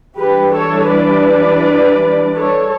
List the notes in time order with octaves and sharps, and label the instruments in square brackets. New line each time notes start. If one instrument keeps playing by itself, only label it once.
[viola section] E3 G3 D4 G4 B4
A4 C#5
B4 D5
A4 C#5